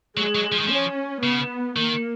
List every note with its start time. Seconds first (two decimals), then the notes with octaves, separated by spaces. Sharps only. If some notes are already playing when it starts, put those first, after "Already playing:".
0.17 F#3 G#3
0.35 F#3
0.52 F3
0.60 D#3
0.67 F3 C#4
1.23 C#3 B3
1.76 D#3 A#3